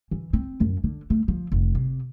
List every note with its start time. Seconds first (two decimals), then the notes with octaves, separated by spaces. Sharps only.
0.11 E3
0.33 C4
0.60 F#2
0.84 D3
1.10 A3
1.28 F3
1.52 F1
1.75 C3